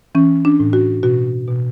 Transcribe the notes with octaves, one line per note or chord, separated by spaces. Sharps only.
E3 C#4
D4
A2
F#4
B2 F#4
B2